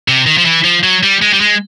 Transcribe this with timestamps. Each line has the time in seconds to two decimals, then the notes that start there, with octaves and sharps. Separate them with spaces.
0.08 C3
0.26 D#3
0.38 F3
0.46 E3
0.64 F3
0.84 F#3
1.03 G3
1.22 G#3
1.33 G3
1.41 G#3